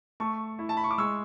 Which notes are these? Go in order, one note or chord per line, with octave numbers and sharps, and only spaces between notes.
A3 A5 C#6
E4
A5
B5
C#6
D6
G#3 C#6 E6